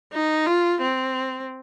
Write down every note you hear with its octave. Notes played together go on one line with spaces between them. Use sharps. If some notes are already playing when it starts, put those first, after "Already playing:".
D#4
F4
C4